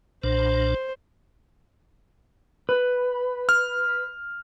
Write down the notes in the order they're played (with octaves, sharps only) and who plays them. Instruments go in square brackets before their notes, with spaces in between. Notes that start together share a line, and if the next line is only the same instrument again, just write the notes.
[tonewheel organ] B1 A#2 D4 [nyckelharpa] C5
[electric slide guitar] B4
[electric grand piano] F6